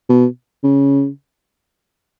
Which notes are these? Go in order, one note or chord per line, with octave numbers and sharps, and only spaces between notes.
B2
C#3